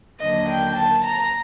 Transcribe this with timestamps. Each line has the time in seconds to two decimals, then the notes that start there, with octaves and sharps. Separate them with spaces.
0.19 D#2 D3 F#3 A#3 D4 D#5
0.48 G5
0.76 A5
1.05 A#5